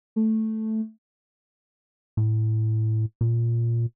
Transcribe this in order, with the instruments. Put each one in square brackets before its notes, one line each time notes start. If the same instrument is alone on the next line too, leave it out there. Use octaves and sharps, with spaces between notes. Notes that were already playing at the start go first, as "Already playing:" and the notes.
[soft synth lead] A3
[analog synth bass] A2
A#2